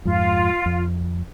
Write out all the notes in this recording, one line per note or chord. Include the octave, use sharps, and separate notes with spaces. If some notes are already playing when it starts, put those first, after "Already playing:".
F2 G#2 F4
F2